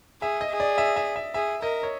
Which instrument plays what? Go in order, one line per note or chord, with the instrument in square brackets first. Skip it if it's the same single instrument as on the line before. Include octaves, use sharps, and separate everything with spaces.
[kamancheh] G#4 [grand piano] E5
[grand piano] D#5
[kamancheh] G#4
[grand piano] D5
E5
E5
E5
[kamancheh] G#4 [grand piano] E5
[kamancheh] A#4 [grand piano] D#5
[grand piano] C#5